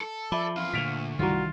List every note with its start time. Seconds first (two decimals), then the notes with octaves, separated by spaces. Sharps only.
0.01 A4
0.32 F3 D5 E5 A5 B5
0.57 E2 F4 F5
0.73 D2 A#2 D3 B6 D7 F7
1.19 C2 D#3 E3 F4 F#4 A#5